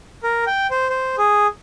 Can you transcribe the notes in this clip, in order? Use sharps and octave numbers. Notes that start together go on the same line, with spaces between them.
A#4
G5
C5
C5
G#4